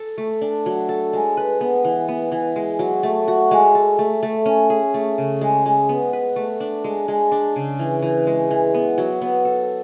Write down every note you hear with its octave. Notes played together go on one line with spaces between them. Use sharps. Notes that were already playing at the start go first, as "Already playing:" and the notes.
Already playing: A4
A3
D4
F#3
A4
G#3
B4
B3
E3
B3
E3
G#3
F#3
A3
F#4
G#3
A4
A3
A3
C#4
G#4
A3
C#3
G#3
G#3
B3
B4
A3
D4
G#3
G#3
D4
C#3
E3
E3
G#3
E3
B3
F#3
B3
A4